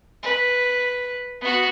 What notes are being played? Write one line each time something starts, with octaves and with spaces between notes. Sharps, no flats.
B4
B3 F#4